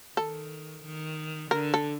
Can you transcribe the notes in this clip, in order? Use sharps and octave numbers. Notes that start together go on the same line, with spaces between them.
D#3 A4
D#3
D3 A#4
A4